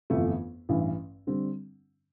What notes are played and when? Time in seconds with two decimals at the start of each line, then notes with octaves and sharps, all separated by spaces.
0.10 G1 F2 E3 A3
0.69 A1 G2 E3
1.27 D3 G3 C4